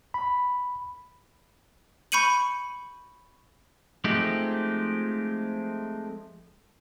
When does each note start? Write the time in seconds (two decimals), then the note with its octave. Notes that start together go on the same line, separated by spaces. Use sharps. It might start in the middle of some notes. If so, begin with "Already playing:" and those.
0.14 B5
2.12 B5 C#6 G6 C#7 D#7 F#7
4.04 F3 G#3 A3 C4 D#4 G4